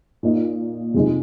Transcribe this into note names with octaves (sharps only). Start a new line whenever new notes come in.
A#2 A#3 D#4
F2 C3 G#3 D#4